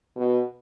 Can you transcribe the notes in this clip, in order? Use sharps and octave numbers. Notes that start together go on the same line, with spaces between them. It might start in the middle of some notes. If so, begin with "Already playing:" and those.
B2